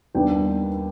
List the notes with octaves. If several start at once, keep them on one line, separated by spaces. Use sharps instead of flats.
D#2 D#3 G3 B3 D4 G5